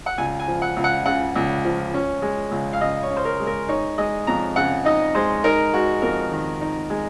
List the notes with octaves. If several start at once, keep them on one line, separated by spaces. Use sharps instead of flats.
F#5
C#2 G#5
G#5
F3
F#5
C#2
F#5
C#3 F#5
C#2
F3
C#4
G#3
C#2
F5
C#3 D#5
C#5
C#4
C5
A#4
G#3
A#4
D#4 C#5
G#3 D#5
F2 A#5
C#3 F#5
D#4 D#5
G#3 C5
D#4 A#4
G#3 F#4
F2 A#4
D#3
D#4
G#3